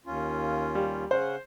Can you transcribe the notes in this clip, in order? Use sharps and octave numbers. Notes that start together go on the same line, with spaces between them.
D#2 C#4 F4
G3
C#3 C#4 C5 F#5